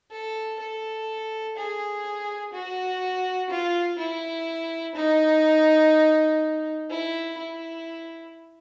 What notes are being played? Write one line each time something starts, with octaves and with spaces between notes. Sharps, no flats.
A4
A4
G#4
F#4
F4
E4
D#4
E4
E4